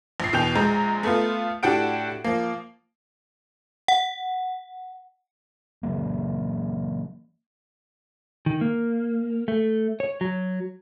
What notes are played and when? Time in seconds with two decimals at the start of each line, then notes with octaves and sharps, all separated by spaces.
0.20 A#1 C7
0.33 E2 B2 G5 G6 F7
0.55 A#1 G#3 A#5
1.03 A3 B3 F4
1.63 A2 D4 F#4 G4 F#5 D7
2.24 F3 A#3
3.88 F#5
5.83 C#3 E3 F#3 A#3
8.46 D#3
8.61 A#3
9.48 A3
10.00 C#5
10.21 F#3